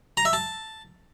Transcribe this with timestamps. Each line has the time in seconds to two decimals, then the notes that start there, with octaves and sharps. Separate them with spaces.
0.17 A#5
0.25 E5
0.33 A5